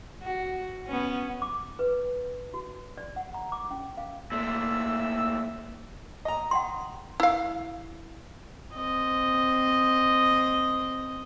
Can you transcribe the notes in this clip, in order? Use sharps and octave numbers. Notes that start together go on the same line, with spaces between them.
F#4
B3 C#4
D6
B4
F#4
D5
F#5
A#5
D6
C#4
F5
A#2 A3 E6
D#5 A#5
F#5 G5 C6
E4 F5
C4 D#5